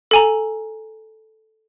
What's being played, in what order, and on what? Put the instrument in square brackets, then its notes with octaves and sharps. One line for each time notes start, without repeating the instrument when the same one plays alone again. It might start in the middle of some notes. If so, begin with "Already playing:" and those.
[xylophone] A4 G#5 A#5